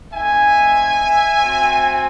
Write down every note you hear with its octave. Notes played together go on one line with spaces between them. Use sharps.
A3 C4 D#4 E5 G#5
A3 C4 F#4